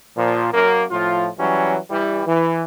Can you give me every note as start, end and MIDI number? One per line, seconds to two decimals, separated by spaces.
0.17 0.53 46
0.17 0.53 53
0.53 0.84 42
0.53 0.84 58
0.90 1.28 45
0.90 1.28 53
0.90 1.28 65
1.38 1.76 52
1.38 1.76 54
1.38 1.76 55
1.38 1.76 61
1.90 2.21 52
1.90 2.21 55
2.26 2.63 52